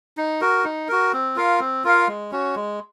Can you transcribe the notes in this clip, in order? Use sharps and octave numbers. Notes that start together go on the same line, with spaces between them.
D#4
F#4 A#4
D#4
F#4 A#4
C4
F4 A#4 F5
C4
F4 A#4 F5
G#3
C#4 F#4
G#3